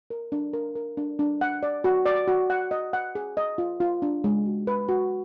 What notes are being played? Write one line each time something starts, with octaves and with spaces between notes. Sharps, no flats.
A#4
D4
A#4
A#4
D4
D4
F#5
D5
F#4
D5
F#4
F#5
D#5
F#5
G#4
D#5
F4
F4
D4
G#3
F#4
B4
F#4